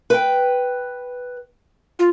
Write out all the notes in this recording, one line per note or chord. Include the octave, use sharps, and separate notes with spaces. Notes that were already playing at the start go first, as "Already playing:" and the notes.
B4 G5
F4